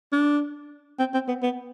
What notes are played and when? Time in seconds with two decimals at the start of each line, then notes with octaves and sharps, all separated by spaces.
0.12 D4
0.99 C4
1.14 C4
1.28 B3
1.42 B3